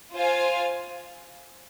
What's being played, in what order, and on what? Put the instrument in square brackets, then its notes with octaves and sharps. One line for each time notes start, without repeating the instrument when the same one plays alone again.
[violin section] F4 C5 F5 G#5